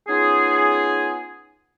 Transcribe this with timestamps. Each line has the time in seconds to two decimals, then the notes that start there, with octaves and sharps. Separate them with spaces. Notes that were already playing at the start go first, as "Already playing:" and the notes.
0.08 B3 C#4 D#4 F4 G#4